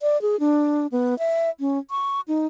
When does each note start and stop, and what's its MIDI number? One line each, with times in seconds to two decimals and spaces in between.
0.01 0.20 74
0.22 0.39 68
0.40 0.87 62
0.92 1.17 59
1.19 1.50 76
1.60 1.79 61
1.90 2.21 85
2.28 2.47 63